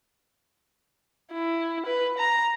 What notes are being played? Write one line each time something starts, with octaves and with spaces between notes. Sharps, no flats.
E4
B4
A#5